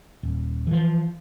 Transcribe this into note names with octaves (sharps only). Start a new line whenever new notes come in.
D#1
E3 F3